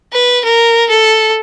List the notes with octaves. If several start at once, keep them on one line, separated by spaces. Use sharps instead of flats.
B4
A#4
A4